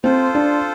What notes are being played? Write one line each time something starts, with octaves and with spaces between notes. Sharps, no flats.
C4 F4 A4 C5
D4